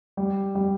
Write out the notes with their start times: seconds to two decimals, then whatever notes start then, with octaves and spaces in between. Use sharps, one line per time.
0.17 G3
0.55 G3